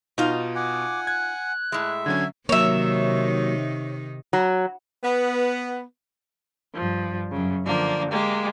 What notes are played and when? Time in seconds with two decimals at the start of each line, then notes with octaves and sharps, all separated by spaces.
0.18 B2 D#4 F4
0.55 F#5 G#5 D6
1.07 F#6 G#6
1.72 A2 G#3 E5
2.06 D3 F#3 C#4 G#6
2.49 C3 D#3 F#3 A#3 D#4 C#5 E5
4.33 F#3
5.03 B3
6.74 G2 F3
7.32 F#2 C#3
7.65 D3 F3 A#3 D4
8.10 G#3 A#3 G4